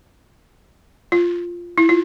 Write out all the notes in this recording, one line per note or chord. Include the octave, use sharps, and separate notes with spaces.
F4
E4
F4